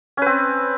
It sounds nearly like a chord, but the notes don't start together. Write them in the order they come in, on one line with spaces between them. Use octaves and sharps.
C#4 B4 C4